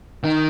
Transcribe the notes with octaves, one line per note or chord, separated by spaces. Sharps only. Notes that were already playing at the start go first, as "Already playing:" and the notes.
D#3